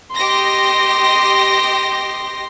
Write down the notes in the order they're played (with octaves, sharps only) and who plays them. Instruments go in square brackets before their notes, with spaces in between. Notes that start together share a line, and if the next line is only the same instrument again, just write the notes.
[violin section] G4 D#5 A#6 [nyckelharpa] C6